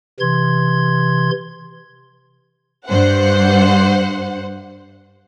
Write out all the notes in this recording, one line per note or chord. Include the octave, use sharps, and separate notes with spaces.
C3 E3 C6 G#6
G2 C5 F#5